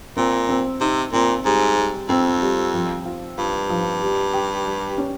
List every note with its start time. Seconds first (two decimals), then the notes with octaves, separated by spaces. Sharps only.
0.17 A#2 C4
0.49 C4
0.81 C3 D#4
1.13 A#2 C4
1.45 G#2 G3
1.77 G3
2.09 F2 C4
2.41 G3
2.74 F3
3.06 F4
3.38 G2 F4
3.70 F3
4.01 G3
4.34 G4
4.66 G3
4.98 C#4